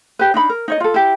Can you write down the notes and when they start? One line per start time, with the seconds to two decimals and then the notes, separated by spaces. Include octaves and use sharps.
0.19 G4 B4
0.34 D4 D#4 B5
0.49 A#4
0.68 D#4 C#5 D#5
0.80 F4 A4
0.94 E4 G4